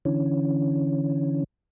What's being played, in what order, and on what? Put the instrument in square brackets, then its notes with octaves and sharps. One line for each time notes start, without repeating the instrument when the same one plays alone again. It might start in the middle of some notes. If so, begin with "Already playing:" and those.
[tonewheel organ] D3 E3 C#4